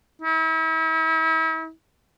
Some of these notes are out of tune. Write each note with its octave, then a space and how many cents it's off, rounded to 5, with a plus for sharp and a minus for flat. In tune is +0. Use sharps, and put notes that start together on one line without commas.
E4 -40